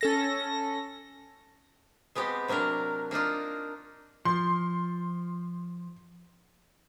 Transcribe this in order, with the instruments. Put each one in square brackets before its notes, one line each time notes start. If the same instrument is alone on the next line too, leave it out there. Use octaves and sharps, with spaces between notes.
[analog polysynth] C#4 A4 A#6
[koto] G#3 B3 C4 G4
C3 F#3 A#3 D4 A#4
A#3 D4 D#4 F4
[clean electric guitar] F3 [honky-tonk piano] C6